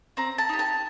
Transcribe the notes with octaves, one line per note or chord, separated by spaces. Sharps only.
C4 A#5
A5
D#4 G4
A5